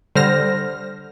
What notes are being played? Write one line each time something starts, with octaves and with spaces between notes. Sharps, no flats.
D3 G3 C5 F6 A#6